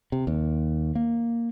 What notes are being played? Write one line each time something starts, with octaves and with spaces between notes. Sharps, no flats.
C3
D#2
A#3